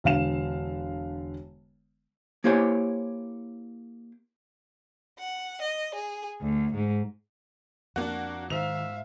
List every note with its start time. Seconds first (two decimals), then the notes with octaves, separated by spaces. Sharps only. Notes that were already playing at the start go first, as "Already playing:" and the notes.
0.04 E1 D3 F5 E7
2.44 A#3 E4 G4 C5 C#5 G#5
5.19 F#5
5.62 D#5
5.94 G#4
6.42 D2
6.75 G#2
7.96 F2 A#3 D4 F#4
8.50 G#2 D#3 E5 F5 F7